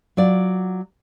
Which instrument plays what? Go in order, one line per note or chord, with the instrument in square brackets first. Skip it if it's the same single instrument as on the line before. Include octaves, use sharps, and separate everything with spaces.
[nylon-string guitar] F#3 F4 D5